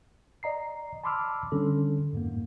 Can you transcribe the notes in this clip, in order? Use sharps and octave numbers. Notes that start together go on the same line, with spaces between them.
D5 D#5 A#5 C7
A5 B5 C6 D6 E6 F6
D3 G3 C#4 D4 A4
F2 G#2 A#3